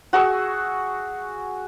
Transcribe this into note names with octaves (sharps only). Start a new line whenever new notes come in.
F#4 G#4 C#6 E6